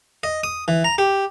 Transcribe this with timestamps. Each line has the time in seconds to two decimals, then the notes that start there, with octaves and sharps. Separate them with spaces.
0.23 D#5
0.44 D#6
0.68 E3
0.84 A#5
0.98 G4